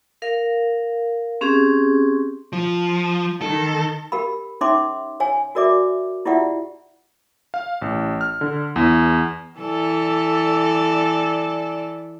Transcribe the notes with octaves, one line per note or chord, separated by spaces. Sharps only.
A#4 F5
C4 C#4 G4 G#4
F3
D#3 A4
G4 A#4 F5 B5
C#4 D#4 C#5 E5 C6 D6
C#5 F5 G#5
F#4 A#4 D5 E5 D6
E4 F4 G4 D5 E5 F#5
F5
A1
F6
D3
E2
E3 A4 D5